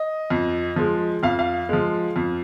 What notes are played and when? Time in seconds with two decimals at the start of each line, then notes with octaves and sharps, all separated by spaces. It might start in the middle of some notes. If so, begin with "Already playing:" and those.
Already playing: D#5
0.30 F2
0.76 F3 G#3
1.23 F2 F5
1.39 F5
1.69 F3 G#3
2.16 F2